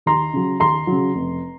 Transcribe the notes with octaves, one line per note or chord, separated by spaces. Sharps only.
D#2 A#5 C6
C#3 F#3
D#2 A#5 C6
C#3 F#3
F1